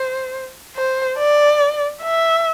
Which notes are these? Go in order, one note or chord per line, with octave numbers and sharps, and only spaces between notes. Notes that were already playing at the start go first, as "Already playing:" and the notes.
Already playing: C5
C5
D5
E5